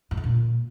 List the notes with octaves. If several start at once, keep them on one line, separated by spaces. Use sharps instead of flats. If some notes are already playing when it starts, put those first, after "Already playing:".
G2
D3
A#2